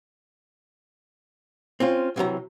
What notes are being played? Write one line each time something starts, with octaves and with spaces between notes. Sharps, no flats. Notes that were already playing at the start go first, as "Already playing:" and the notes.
C4 C#4 F4
C2 C3 E3 F#3 A#5